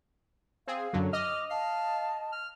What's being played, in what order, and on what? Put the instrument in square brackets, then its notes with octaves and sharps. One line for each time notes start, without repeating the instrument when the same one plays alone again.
[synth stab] C4 G#4 [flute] F5
[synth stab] F#2 D3 F#3
[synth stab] D#5 [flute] D6 [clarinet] F6
[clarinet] F5 [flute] A5
[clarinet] F6